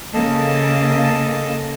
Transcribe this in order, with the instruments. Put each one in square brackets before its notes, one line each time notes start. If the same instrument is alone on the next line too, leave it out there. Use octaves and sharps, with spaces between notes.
[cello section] C#3 A#3 [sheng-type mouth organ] A4 D#5 A5